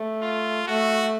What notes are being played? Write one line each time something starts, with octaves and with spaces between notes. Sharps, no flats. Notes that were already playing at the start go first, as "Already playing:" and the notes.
Already playing: A3
F4
A3 F#4